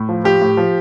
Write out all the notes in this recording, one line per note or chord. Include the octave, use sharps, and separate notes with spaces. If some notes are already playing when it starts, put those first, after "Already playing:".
Already playing: A2
F3
F3 G4
A2
F3